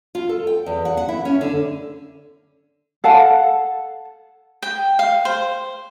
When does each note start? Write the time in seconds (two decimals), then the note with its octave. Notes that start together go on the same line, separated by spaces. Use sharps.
0.15 F4
0.29 A4
0.47 G5
0.66 E2
0.85 F#5
0.97 F#5
1.09 E4
1.25 C#4
1.41 D3
3.04 A4 F5 F#5 A5
4.62 G5
4.99 F5
5.25 C5